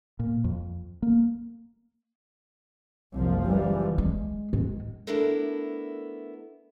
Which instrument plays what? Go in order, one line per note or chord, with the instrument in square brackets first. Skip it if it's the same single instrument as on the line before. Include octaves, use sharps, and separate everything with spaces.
[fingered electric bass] A#2
F2
A#3
[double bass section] F#1 F3 [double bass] C2
[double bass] E3 G3
[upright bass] G#3
G#2
[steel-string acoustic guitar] A3 B3 D4 E4 A4 A#4